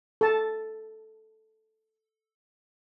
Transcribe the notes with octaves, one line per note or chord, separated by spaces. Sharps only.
A4 A5